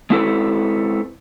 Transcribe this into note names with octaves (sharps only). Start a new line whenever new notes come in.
G#3 C4 E4 A4 B4